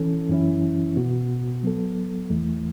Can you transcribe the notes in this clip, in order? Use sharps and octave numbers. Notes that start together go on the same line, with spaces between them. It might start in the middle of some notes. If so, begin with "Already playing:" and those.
Already playing: E3 C#4 A4
F#2 E3 C#4 E4
B2 B3 F#4
F#3 B3 A4
E2 E3 A3